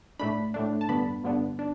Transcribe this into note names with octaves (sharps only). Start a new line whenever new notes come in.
A2 A3 D4 B5
A2 A3 D4
A5
G2 D3 B3 D4 B5
G2 D3 B3 D4
D4